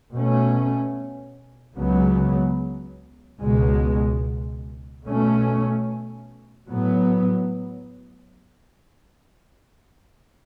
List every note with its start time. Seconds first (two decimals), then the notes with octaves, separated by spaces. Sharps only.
0.13 B2 A3 C#4
1.77 C#2 C#3 F#3 B3
3.41 C#2 B2 G#3
5.05 B2 A3 C#4
6.69 A2 F#3 B3